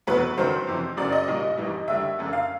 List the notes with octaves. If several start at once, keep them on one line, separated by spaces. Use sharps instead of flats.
F1 E2 B2 F#3 B4
G1 F#2 D#3 F#3 C5
F2 C3 E3
F#1 F#2 C#3 F#3 D5
D#5
B1 A#2 G3
G#1 G#2 E3 G3
D#2 D3 G3 E5
F#1 F#2 D3
F5